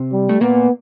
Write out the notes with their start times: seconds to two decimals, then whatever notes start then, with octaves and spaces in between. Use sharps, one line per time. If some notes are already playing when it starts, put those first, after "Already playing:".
Already playing: C3 C4
0.12 G3
0.29 A3
0.41 A#2 A#3 B3